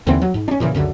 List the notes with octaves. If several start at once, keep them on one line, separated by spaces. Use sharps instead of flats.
D#2 D3 E3 C4
F#3
G#2
C#4 D4
A#2 C#3 E3
C#2 F#2 D3